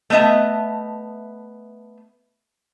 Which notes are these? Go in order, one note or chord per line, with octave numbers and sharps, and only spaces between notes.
A3 B3 D#5 E5 A5